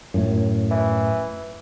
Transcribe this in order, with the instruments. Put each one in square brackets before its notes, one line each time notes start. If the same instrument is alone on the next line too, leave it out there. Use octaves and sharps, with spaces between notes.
[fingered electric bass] F#2 A2
[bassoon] E3